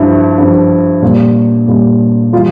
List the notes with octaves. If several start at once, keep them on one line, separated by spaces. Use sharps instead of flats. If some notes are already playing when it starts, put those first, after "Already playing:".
Already playing: G2 F3 E4
G2 F3
A#2 G3
A#2 G3
E3 G3 F4